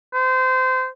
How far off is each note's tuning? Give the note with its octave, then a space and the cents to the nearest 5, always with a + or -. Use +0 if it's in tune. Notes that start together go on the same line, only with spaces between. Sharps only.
C5 -25